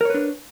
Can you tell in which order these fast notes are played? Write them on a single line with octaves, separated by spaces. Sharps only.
A#4 C#5 B4 D4